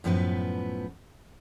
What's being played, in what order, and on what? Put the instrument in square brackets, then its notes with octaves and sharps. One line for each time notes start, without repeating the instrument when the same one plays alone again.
[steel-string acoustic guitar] F#2 A2 F3 B3 B4